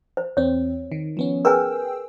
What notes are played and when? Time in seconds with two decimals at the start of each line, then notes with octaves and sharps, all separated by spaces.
0.17 C5
0.37 E2 C4 C#5
0.92 D#3
1.17 F3 B3 C#4
1.45 G#4 A#4 B4 G5 G#5 E6